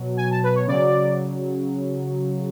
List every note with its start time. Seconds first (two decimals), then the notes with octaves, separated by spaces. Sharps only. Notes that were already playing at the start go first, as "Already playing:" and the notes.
Already playing: B2 F#3
0.17 G#5
0.31 A5
0.43 B4
0.55 C#5
0.67 C#3 F#3 D5